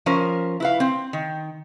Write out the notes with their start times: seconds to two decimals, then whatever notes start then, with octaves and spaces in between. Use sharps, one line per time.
0.06 F3 C#4 A#4 C5
0.60 E4 B4 F5
0.80 C4
1.13 D#3